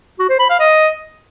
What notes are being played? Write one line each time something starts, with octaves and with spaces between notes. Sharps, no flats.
F#4
C5
B5
F5
D#5